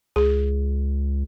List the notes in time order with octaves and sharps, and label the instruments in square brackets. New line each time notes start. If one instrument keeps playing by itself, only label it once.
[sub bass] C#2 [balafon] G#4